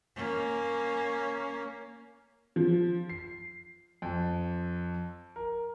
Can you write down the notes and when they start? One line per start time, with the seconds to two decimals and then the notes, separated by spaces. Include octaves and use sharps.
0.16 A#3 C#4
2.56 F3
3.09 C7
4.02 F2
5.36 A#4